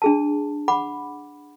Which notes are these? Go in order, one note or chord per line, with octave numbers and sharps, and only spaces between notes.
D4 G#4 A5
F#5 B5 D6